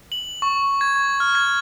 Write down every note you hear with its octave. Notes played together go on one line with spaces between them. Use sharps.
F#7
C#6
G#6
C#6
F6
G#6